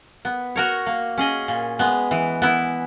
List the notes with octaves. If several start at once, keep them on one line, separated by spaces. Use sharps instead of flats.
B3
F#4 A#4 C#5
A#3
C#4 G#4 D#5
A#2
G#3 B3
E3
B3 E4